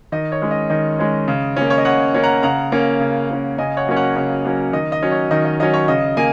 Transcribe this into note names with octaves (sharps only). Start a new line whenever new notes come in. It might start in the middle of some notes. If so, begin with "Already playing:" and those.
D#3 D#5
C#5
G#3 C#4
D#5
D#3 D#5
G#3 C#4
C#3
A#3 C#4
C#5
D#5
C#3 C#5 F#5
A#3 C#4
F#5 A#5
C#3 F#5 A#5
A#3 C#4
C#3
A#3 C#4
C#3 D#5 G#5
C#5 F#5
F#3 A#3 C#4
C#5 F#5
C#3 C#5
F#3 A#3 C#4
D#3 D#5
D#5
F#3 C#4
C#5
D#3 D#5
D#5
F#3 C#4 D#5
C#5
C#3 D#5
A#3 D#5 G#5